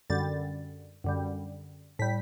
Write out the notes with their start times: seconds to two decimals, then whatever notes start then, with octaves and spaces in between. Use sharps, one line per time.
0.10 F#2 D3 G3 A6
1.04 F#2 D3 G3
1.99 A2 G3 B6